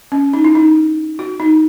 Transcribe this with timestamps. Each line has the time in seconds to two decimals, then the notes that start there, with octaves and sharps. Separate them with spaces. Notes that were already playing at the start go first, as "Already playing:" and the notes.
0.12 C#4
0.33 D#4
0.44 E4
0.55 D#4
1.19 F#4
1.40 D#4